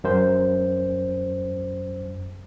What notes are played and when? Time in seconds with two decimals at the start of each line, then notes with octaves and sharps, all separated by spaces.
0.04 F#2 C5